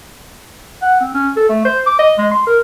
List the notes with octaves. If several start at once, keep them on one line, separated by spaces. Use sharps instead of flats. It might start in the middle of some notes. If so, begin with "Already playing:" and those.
F#5
C4
C#4
A4
A3
C5
D6
D#5
G#3
C6
A#4